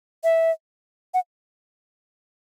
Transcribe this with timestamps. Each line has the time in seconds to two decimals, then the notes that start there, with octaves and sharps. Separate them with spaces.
0.24 E5
1.14 F#5